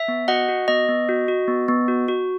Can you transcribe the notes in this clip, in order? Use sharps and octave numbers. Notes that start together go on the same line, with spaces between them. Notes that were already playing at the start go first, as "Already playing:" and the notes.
Already playing: E5
B3
F#4 D#5 F#5
F#4
B3 D#5
B3
F#4
F#4
B3
B3
F#4
F#4